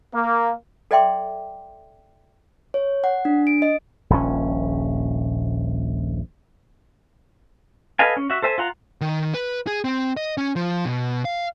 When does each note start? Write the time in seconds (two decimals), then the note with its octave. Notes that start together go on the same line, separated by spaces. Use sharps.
0.14 A#3
0.91 A4 D5 E5 G5 C6 D6
2.74 C#5
3.04 F#5
3.25 D4
3.47 D7
3.62 D#5
4.10 D#1 A#1 C#4
7.99 A4 B4 D#5 F5 G#5
8.17 C#4
8.30 F#4 E5
8.42 A4 C5 E5 G#5
8.58 F4 F#5 A#5
9.01 D#3
9.34 B4
9.67 G#4
9.84 C4
10.17 D#5
10.38 C#4
10.56 F3
10.85 B2
11.25 F5